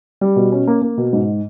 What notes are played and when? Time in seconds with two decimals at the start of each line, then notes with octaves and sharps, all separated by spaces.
0.21 G3
0.36 B2
0.52 C#4
0.67 A#3
0.82 A#3
0.98 B2
1.13 G#2